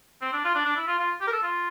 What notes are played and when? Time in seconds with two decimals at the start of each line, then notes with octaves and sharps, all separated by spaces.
0.21 C4
0.33 D4
0.44 F4
0.55 D4
0.65 D4
0.76 E4
0.87 F4
0.99 F4
1.21 G4
1.27 A#4
1.33 A4
1.43 F4